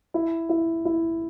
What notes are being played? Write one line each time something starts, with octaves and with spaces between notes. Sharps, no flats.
E4
E4
E4